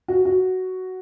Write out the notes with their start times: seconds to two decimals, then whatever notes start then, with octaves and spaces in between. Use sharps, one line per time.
0.08 F#4
0.25 F#4